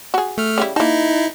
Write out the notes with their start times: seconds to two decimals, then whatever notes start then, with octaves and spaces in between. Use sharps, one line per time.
0.14 F#4 G#4
0.38 A3 F6
0.58 C#3 G3 E4
0.76 A#3 D#4 E4 A5